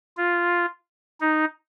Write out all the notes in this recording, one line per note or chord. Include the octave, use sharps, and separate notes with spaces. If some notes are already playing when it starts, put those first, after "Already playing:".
F4
D#4